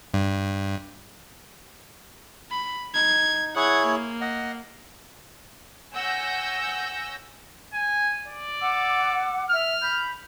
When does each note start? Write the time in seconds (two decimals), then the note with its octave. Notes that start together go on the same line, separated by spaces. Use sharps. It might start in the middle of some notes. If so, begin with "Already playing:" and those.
0.14 G2
2.51 B5
2.94 D#4 G#6
3.56 E4 G#4 C#5 F#5 G#6
3.85 A#3
4.21 D#5 F#5
5.93 C#5 F#5 G#5 E6 G6 A#6
7.74 G#5
8.28 D5
8.59 F#5 D6 E6
9.50 E5 F6
9.82 B5 G6